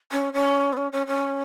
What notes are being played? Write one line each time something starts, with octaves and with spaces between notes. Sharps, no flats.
C#4
C#4
B3
C#4
C#4
C#4